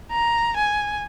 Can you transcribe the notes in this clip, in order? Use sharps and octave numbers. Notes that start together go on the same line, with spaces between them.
A#5
G#5